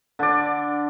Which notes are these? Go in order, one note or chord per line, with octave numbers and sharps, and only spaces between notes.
D3 D5